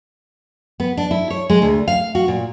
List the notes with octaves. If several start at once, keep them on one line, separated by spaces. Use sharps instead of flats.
B3
D4
E4
C#5
G#3
D2
F5
F#4
A#2